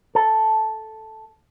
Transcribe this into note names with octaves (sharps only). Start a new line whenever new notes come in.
A4